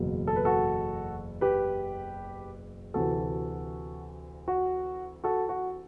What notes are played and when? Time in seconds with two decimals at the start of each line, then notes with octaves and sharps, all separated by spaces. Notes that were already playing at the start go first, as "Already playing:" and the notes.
Already playing: F#1 E2 B2 F#3
0.27 A4
0.36 B4
0.45 F#4 A4
1.41 G4 B4
2.94 D2 C3 E3 F#4 A4
4.48 F#4
5.24 F#4 A4
5.49 F#4